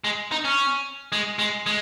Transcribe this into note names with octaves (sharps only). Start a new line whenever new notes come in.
G#3
D#4
C#4
G#3
G#3
G#3